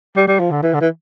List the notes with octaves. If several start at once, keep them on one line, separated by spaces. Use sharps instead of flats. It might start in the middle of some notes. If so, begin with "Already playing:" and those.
G3
G3
F3
D3
E3
D3
E3